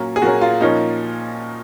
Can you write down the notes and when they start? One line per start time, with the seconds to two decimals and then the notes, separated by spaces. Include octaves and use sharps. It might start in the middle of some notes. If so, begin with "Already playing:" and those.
Already playing: A#2 F#3 A#3 C#4
0.16 G#4
0.22 A#2 F#3 A#3 C#4 F#4
0.41 F4
0.61 A#2 F3 A#3 C#4 D#4